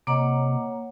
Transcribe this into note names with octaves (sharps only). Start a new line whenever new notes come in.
C3 A#3 C#5 D#5 F#5 A#5 D6